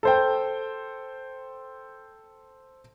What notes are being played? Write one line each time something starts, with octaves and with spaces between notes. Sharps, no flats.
A4 C5 G5